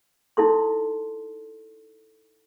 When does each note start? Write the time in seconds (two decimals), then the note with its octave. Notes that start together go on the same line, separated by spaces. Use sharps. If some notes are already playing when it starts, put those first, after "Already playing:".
0.37 D#4 E4 A4 C6